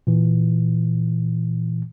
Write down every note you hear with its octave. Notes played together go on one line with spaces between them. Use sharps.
A#2 E3